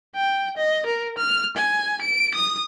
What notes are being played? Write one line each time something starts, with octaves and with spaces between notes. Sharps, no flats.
G5
D#5
A#4
F6
G#5
D7
D#6